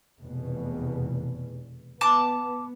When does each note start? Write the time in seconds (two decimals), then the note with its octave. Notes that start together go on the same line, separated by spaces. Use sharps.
0.21 F1 E2 B2
2.01 B3 A5 D6